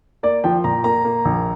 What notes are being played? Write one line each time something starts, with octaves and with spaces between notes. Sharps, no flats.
A#3 D5
F3 G5
A#2 A#5
A#3 A#5
A#3
A#1